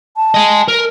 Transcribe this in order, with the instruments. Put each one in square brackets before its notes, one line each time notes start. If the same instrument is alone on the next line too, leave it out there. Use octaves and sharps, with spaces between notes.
[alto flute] A5
[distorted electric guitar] D#5 G#5
A#4